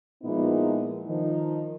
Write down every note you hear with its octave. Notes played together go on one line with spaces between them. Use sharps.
A#2 F3 G#3 B3 D#4 E4
D#3 F3 D#4